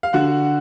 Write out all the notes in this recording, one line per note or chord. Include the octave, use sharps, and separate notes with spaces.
F5
D3 F#4 F#5